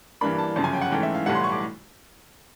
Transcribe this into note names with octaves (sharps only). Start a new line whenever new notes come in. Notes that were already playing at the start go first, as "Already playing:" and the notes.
G2 E3 G3 A#3 D4 B5
A5
G1 F#2 C#3 F3 A5
G#5
G5
F#5
G#2 E3 A3 C#4 G5
E5
F5
B1 A2 E3 G3 F#5
C6
C#6
D6